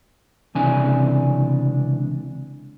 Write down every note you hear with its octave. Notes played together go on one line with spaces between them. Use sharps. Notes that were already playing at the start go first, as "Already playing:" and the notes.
C#2 C3 E3 D4 G#5